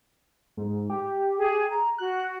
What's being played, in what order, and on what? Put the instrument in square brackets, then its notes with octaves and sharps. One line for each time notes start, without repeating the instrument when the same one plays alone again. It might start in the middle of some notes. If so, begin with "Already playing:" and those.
[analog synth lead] G#2
G4
[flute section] G#4
A#5
[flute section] F#4 [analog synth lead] F#6